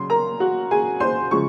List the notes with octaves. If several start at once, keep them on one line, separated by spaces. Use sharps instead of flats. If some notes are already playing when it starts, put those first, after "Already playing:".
Already playing: C#3 F#3 C6
A#4 A#5
F#4 F#5
G#4 G#5
C5 C6
C#3 F3 G#3 C#6